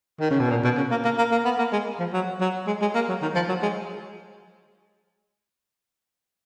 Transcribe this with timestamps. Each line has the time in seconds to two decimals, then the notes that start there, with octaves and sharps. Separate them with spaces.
0.20 D#3
0.30 C#3
0.40 B2
0.51 A#2
0.64 B2
0.77 C#3
0.91 A#3
1.04 A#3
1.18 A#3
1.31 A#3
1.45 B3
1.58 A#3
1.72 G#3
1.99 F3
2.13 F#3
2.40 F#3
2.67 G#3
2.81 G#3
2.95 A#3
3.09 F#3
3.22 D#3
3.35 F3
3.48 F#3
3.62 G#3